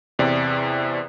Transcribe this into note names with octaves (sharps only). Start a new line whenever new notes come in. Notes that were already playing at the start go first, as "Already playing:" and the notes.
E2 C3 D5